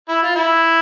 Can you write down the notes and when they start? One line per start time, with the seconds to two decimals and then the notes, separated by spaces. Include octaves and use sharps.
0.09 E4
0.23 F4
0.36 E4